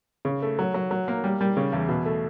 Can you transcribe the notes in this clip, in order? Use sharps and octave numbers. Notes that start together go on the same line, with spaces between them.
C#3
A3
F#3
F#3
F#3
A#3
G3
G3
C#3
E2
B2
A3